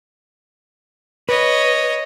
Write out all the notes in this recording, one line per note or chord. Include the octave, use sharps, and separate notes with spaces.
B4 C#5 D#5